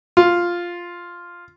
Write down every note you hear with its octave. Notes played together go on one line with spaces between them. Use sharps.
F4